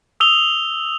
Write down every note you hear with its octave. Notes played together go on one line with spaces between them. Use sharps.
D#6 E6 F7 G7